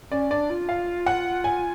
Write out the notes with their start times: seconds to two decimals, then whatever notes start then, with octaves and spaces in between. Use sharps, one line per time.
0.11 C#4 D5
0.31 D4 D5
0.50 F4
0.69 F5
1.06 F#5
1.44 G#5